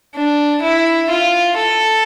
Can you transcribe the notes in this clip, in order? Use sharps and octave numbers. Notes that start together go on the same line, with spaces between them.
D4
E4
F4
A4